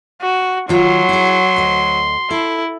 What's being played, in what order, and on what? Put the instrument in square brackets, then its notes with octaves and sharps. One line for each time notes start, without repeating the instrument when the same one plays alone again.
[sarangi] F#4
[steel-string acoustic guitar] D#3 F4 [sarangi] F#3 [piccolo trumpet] C6
[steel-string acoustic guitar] E4 G#4
D2 D#5
[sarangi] E4 [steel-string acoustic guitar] A4